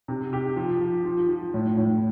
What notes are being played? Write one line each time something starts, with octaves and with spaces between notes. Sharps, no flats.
C3
G4
F3
F3
F3
F3
A2
A2